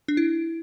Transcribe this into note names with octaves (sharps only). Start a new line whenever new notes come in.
D4
E4